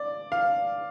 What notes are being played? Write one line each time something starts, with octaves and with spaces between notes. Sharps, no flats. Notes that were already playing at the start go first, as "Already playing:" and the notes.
Already playing: D5
F5